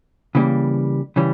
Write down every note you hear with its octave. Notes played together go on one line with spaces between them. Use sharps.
C#3 E3 G3 A#3
C#3 E3 G3